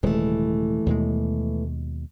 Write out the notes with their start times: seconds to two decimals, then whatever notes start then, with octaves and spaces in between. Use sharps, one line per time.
0.03 D#1 C3 E3 G#3 A3
0.86 D#2 B2 G#3